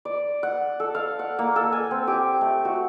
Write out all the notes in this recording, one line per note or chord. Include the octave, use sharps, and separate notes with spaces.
D5
F#5
A4
F5
F#5
A#3
A4
G#5
C4
G4
A3
F#4